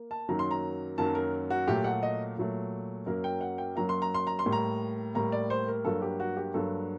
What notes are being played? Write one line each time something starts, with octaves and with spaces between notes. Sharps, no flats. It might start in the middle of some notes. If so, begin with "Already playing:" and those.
Already playing: A#3
A5
F#2 D#3 F#3 A#3 A#5
C6
A#5
F#2 D#3 F#3 A#3 A5
A#4
F#4
A#2 F#3 A3 G4
F#5
D#5
A#2 F#3 A3
F#2 F#3 A#3 A#4
G5
F#5
G5
F#2 F#3 A#3 A#5
C6
A#5
C6
A#5
C6
A2 G3 A#3
A#5
A2 G3 A#3 A#5
D5
C5
A#4
G2 F#3 A#3 A4
G4
F#4
G4
G2 F#3 A#3 A4